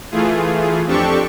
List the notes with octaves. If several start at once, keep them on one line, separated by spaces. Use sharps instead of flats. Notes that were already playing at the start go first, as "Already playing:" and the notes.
E3 A3 F4 G#4
F2 C4 D4 G4 A4 C#6